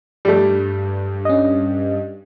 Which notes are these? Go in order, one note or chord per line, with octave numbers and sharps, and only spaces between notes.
G2 G3 A3
C#4 D#5